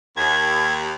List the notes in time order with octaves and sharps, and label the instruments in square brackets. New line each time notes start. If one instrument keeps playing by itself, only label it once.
[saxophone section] D#2 [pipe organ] G#6